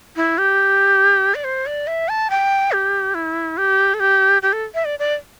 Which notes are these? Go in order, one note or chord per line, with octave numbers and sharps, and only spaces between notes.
E4
G4
D5
C5
D5
E5
A5
G5
G4
E4
G4
A4
G4
G4
A4
E5
D5
D5